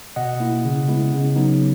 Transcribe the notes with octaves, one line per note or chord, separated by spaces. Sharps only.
B2 D#5 F#5
A#3 E4
C#3
G#3 B3 E4
C#3
F#3 B3 D#4